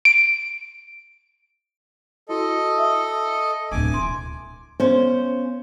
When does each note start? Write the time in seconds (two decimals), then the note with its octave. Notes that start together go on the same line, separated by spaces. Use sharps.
0.05 D7
2.29 E4 F#4 A4 D#5
2.78 E5 D#6
3.72 D1 B1 G#5 D6
3.94 E3 C6
4.80 B3 C#4 C5